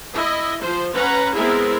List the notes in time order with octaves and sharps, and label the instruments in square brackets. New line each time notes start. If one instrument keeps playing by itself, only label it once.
[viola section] E4 D#5
F3 C5
C#4 B4 F#5 A#5
G#3 B3 C4 E4 G#4 A#4